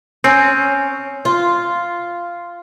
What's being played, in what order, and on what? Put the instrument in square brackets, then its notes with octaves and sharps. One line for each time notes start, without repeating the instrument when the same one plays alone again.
[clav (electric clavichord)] C4 [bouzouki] C#4
[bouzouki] F4